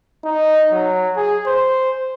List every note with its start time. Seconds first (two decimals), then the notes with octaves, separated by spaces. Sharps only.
0.24 D#4
0.71 F#3
1.16 G#4
1.46 C5